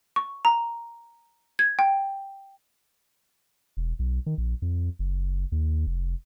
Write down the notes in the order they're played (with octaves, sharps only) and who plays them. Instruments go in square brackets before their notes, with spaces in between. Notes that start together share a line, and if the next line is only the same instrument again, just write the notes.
[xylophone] C#6
A#5
G#6
G5
[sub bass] E1
B1
D#3
A#1
F2
F#1
D#2
F1